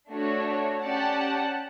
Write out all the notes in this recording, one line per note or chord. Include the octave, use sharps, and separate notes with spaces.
A3 D4 F#4 C#5
C#4 G4 D5 F#5 A5